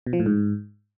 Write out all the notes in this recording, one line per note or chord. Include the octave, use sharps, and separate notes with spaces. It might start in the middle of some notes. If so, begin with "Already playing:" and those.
B2
F3
A2
G#2